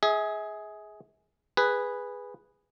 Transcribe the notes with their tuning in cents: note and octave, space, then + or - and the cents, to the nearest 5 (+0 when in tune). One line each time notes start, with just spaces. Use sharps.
G#4 +10 E5 -40
G#4 -10 B4 +0